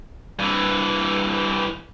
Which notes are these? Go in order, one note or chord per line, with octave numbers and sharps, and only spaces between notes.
G2 E3